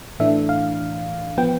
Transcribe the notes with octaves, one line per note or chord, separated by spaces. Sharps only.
A2 E3 A3 D4 E5
F5
F3 B3 G5